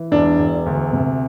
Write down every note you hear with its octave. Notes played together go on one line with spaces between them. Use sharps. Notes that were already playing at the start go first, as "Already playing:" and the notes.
Already playing: E3
E1 D4
E1
D2
C3